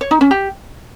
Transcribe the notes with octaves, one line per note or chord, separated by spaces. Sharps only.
C#5
D#4
C#4
G4